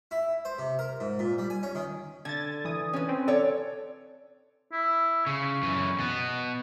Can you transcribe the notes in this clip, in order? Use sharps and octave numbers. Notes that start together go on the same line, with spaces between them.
E4
C5
C3
A#4
G#2
A#2
G3
G#5
C#4
D#3
D3 G#6 A6
E3 D#6
C#4 B4
C4
A4 C#5 D5
E4
C#3 C#6
F#2 E3
B2 B3